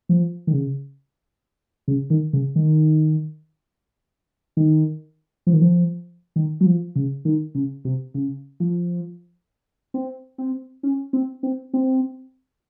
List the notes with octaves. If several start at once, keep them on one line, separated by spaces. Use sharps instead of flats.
F3
D#3
C#3
C#3
D#3
C#3
D#3
D#3
F3
D#3
F3
D#3
F#3
F3
C#3
D#3
C#3
C3
C#3
F3
C4
C4
C#4
C4
C4
C4